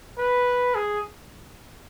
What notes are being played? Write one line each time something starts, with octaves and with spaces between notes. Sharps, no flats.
B4
G#4